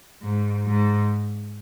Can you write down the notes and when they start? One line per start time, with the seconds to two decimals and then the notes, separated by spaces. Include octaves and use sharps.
0.22 G#2
0.66 G#2